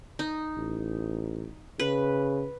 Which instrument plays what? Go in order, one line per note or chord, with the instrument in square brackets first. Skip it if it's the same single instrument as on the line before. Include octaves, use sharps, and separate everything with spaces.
[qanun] D#4
[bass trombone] A1
[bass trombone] C#3 [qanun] B4